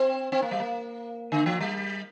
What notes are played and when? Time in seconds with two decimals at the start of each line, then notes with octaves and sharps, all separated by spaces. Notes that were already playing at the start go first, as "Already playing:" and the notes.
Already playing: C4
0.32 C4
0.42 A#3
0.51 G3
0.60 A#3
1.32 D3
1.46 F3
1.61 G3